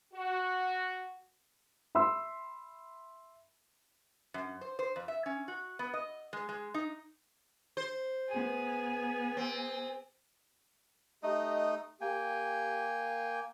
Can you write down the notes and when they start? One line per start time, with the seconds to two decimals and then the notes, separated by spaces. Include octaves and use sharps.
0.14 F#4
1.95 E5 B5 C6 E6
4.34 F#2
4.61 C5
4.79 C5
4.96 F2
5.08 E5
5.26 C#4
5.48 F#4
5.79 B3
5.94 D#5
6.33 G#3
6.49 G#3
6.74 D#4
7.77 C5
8.28 B3 G#4
9.37 C4
11.23 A3 D#4 G4 D#5
12.01 A#3 G4 G5 G#5